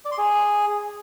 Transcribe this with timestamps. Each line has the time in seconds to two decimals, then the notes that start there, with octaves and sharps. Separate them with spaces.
0.05 D5
0.12 C6
0.18 G#4